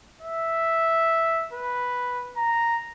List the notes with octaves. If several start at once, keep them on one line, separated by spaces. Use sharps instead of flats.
E5
B4
A#5